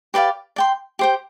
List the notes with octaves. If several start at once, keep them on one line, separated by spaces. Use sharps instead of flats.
G4 B4 D5 F5
D5 G5 C6
G4 C5 G5